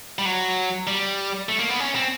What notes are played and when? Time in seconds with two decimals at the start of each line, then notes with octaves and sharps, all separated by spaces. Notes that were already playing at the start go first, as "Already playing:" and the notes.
0.18 G3
0.26 F#3
0.87 G3
1.49 A3
1.59 A#3
1.70 B3
1.80 C#4
1.95 C4